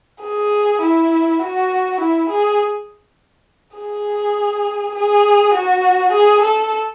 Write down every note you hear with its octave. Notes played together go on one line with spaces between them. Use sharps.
G#4
E4
F#4
E4
G#4
G#4
G#4
F#4
G#4
A4